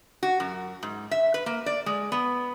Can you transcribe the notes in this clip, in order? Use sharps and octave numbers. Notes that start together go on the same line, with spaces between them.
F#4
F#2
G#2
E5
B4
A#3
D5
G#3
B3